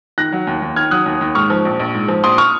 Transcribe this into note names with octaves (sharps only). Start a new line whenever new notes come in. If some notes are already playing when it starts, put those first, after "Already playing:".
D#3 F#6 A#6
F#3
D#2
D#2
D#3 F6 G#6
F#3 D#6 F#6
D#2
D#2
G#2 C#6 F6
F3
A#1
A#1
G#2
F3
A#1 C6 D#6
C#6 F6